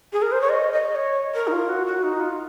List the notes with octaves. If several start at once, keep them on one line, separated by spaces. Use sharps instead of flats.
G#4
A#4
C5
C#5
D#5
D#5
C#5
A#4
D#4
F4
F#4
F#4
D#4
F4